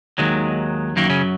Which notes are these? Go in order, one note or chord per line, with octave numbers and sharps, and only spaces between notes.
D#2 D#3 F#3 G#3
F#2 D#3 F#3 A#3
C#3 C#4